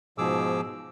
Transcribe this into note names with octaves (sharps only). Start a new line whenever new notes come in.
G#2 B2 F3 G#4 D6 E6